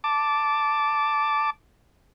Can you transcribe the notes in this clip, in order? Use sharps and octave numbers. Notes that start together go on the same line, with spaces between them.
A5 D6